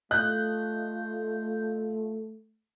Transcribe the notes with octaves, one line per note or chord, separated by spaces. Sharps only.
A3 F4 D#5 F#6 G6